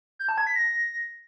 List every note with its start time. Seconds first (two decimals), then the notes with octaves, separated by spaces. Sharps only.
0.19 G6
0.29 A5
0.38 G#6
0.47 B6
0.56 A#6